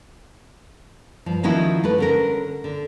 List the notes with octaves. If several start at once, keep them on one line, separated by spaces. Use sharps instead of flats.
G2 F3
D#3 F3 C#4 D#4 E4 F#4
A3 B4
D3 C#4 A#4
D3